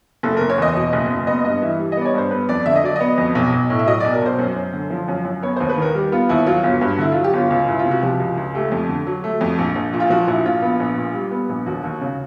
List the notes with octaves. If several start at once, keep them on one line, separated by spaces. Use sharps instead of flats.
F#1 A4
F#1 A#4
C#5
E2 D#5
B2 D#5
F#1
F#1
B3 D#5
G2 D#5
E3 E5
G3
D#5
B3 D5
C#5
G2 C5
B3 B4
F2 D5
D3 E5
D#5
F#3 D5
B3 D#5
F2
B1
B1
A2
E5
F#3 D#5
B1 D5
A#4
B1 C5
F#2
F#2
D3
F3
F#2
F#2
B3 C#5
D#2 C5
B4
D#3 A#4
G3 G4
B3 F4
D#2 E4
F#3 F4
G1
G2
D3 E4
F#3 F4
G4
G1 F4
C#2
C#2 E4
F4
C3
F#4
F3 G4
C#2
C#2
A3 G4
F2
D3
F#3
A3
F2
A#1
A#1
A#2
F4
F3 F#4
A#1 E4
A#1 F4
B3
A#1
A#2
G3
B3
A#1
D#2 F#4
D#2
C#3